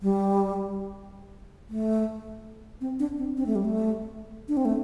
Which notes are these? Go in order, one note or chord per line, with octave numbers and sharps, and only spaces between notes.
G3
A3
C4
D4
C4
C4
A3
G3
A3
D4
C4
A3